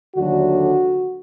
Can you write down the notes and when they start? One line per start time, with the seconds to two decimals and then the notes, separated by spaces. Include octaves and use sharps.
0.16 D#2 D3 F#3 A3 D4 F#4